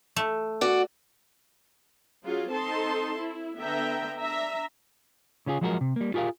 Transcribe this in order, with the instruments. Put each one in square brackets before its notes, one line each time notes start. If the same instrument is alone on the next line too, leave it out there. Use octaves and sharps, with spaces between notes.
[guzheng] A3
[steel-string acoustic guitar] F#4 D5
[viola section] F#3 C#4 F4 G#4
C4 D#4 A4 A5 C6
E4
D3 B3 E5 G5 A#5
D4 E5 A#5
[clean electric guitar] C#3 C#4 F4 G#4
F3 F#3 G#3 F#4 G#4 A#4
C3
G3 A#3
F4 G4 G#4 A#4 F5